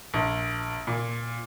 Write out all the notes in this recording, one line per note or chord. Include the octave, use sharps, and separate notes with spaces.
A#1
A#2